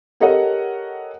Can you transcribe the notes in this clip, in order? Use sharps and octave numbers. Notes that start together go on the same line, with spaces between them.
G4 A4 A#4 C#5 D#5 F#5